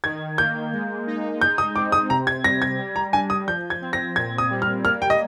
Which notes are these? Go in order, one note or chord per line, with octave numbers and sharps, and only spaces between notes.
D#3 G#6
A#3 G6
G#3
D#4
G#3 G6
D#6
C4 D6
D#6
C3 A#5
G#6
G3 A#6
G#6
G3
A#5
D4 G#5
D#6
F3 G6
G#6
C4
A#6
A#2 G#6
D#6
G3
F6
A#3 F6
G5
D#5